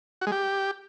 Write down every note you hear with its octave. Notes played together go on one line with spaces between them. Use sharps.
F#4
G#3
G4